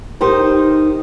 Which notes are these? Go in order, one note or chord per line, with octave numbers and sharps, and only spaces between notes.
D#4 G4 A#4 C5